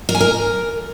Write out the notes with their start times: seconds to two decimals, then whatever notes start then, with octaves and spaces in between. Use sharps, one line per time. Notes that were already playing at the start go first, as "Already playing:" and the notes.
0.09 A#4
0.15 G#5
0.20 A#4